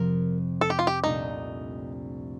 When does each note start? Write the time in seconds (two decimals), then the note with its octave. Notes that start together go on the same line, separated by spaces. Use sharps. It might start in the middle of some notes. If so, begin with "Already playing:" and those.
Already playing: F2 C3 F3 A#4
0.61 A4
0.70 G4
0.79 F4
0.87 G4
1.04 C2 A#2 A3 D4 D#4 F4